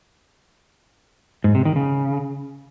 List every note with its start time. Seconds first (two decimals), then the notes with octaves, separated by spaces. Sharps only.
1.44 G#2
1.55 C3
1.65 D#3
1.76 C#3